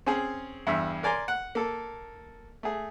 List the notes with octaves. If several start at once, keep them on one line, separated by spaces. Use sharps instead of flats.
C4 C#4 G#4
E2 G2 E5
A#4 D5 G#5 A#5 C6
F#5
A#3 A4
A3 G#4